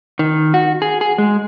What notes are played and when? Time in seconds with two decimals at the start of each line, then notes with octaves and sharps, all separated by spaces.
0.19 D#3
0.54 F#4
0.82 G#4
1.01 G#4
1.18 G#3